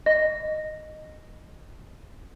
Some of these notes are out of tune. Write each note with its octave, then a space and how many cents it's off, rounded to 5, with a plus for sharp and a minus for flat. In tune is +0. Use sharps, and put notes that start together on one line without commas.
D#5 -10